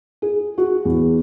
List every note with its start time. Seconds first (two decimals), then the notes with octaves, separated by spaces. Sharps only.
0.22 G#4
0.58 F#4
0.85 E2